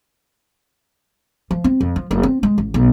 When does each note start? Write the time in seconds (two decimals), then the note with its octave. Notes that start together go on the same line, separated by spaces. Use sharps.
1.51 F3
1.64 C4
1.81 F2
1.96 F3
2.11 F#1
2.23 C4
2.43 G#3
2.58 A1
2.74 B1